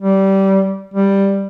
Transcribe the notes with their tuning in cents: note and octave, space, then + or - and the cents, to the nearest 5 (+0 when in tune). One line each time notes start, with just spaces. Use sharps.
G3 -20
G3 +5